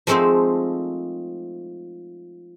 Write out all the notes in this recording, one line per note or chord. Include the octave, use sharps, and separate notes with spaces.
F3 G#3 A3 C4 D#4 C5